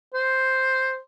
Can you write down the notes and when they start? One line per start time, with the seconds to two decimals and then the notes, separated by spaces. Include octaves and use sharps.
0.14 C5